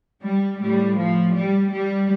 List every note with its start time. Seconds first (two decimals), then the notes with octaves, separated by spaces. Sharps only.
0.22 G3
0.60 A2 G3
0.97 F3
1.34 G3
1.72 G3